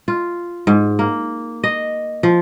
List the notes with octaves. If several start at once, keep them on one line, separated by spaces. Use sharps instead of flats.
F4
G#2
A#3
D#5
F3